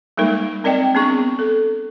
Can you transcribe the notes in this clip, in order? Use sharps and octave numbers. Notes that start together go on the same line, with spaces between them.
G3 G#3 A#3 D#4 A#4
C4 A#4 D5 D#5 G5
B3 C4 D4 G#4 C#6
A4